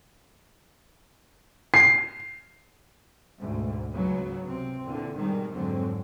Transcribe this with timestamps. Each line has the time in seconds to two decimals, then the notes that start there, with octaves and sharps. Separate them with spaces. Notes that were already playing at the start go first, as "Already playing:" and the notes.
1.74 C7
3.39 D2 G#2 B2
3.92 C#2 G#2 C#3 F#3 B3
4.45 C3 C4
4.83 E2 A#2 D3
5.16 G#2 B2 D#3 G3 G#3
5.53 F2 G#2 D3 F#3 C4